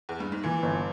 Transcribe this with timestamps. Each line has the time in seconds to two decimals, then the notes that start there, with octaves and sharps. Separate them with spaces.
0.09 E2
0.20 G2
0.32 G#2
0.43 A#2 E3
0.63 G1